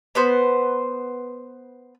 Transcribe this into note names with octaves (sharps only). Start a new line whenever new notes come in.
B3 B4 C5